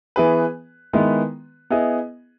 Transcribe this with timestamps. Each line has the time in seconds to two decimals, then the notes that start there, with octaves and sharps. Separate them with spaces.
0.16 E3 B3 E4 G#4 B4
0.93 D#3 G#3 B3 E4 B4
1.70 B3 E4 G#4 D#5